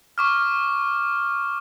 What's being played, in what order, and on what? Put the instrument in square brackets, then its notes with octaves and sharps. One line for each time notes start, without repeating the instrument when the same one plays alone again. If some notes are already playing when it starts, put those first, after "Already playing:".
[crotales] C#6 D6 F6